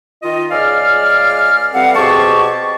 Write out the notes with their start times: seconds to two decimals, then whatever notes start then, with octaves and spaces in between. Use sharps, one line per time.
0.23 D#3 F4 D#5
0.50 C#2 G#4 D5 D#5 F5 F6
1.73 E3 G3 C4 A4 F5 F#5
1.95 B2 C4 G4 G#4 A5 C#6